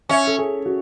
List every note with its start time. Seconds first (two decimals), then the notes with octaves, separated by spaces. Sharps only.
0.09 C#4 E5
0.27 A4
0.39 G#4
0.66 F#4